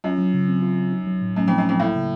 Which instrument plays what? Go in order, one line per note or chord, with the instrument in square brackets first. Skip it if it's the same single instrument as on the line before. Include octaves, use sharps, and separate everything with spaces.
[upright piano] F#2 [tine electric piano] F4
[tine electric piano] F#3
C#3
C4
F4
F#3
D#4
F#3
A2
[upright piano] F#2 [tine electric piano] A3
[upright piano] F2 [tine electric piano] D#4
[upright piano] F#2
[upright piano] F2 [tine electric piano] F#3
[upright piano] A2 [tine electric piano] A#3
[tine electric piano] C#3